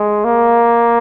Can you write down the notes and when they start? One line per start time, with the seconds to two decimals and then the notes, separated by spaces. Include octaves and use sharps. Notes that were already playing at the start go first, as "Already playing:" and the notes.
Already playing: G#3
0.25 A#3